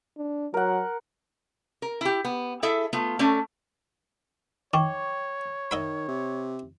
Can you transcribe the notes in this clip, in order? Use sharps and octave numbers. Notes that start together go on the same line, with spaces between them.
D4
F#3 A#4 F#5
A#4
E4 G4
B3
E4 G#4 A4 E5
A3 B3 F4
A3 C#4 A4 D5
D#3 C#5 G5 C#6 D6
D#3 D#5 E5 B5
C3